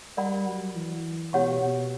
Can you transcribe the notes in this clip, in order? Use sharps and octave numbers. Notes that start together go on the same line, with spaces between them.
G3 A#4 D5 F#5 B5
F#3
E3
B2 G4 C#5 F#5 C#6
B2